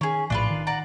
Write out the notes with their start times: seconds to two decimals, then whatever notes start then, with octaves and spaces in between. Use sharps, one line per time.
0.01 D#3 C#4 G#4
0.30 A#1 A2 D4 F4 B4
0.51 D#3
0.67 D5 F#5 A#5